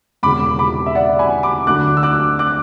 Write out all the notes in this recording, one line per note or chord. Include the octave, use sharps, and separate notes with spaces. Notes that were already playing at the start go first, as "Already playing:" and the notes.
E1 E2 C#3 B5 D6
B5 D6
E5
D5 F#5
G#5 B5
B5 D6
D2 D3 F#3 D6 F#6
E6
D6 F#6
D6 F#6